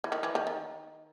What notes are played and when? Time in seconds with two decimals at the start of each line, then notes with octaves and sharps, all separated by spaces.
0.04 E3
0.12 D#3
0.23 E3
0.35 D#3
0.47 D#3